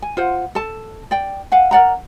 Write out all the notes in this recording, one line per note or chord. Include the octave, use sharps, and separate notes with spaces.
G#5
F4 C5 F#5
A4 A5
D5 G5
F5 F#5 G#5
A#4 D5 F#5 A#5